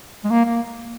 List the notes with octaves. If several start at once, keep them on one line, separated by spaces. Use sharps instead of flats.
G#3
A#3
A#3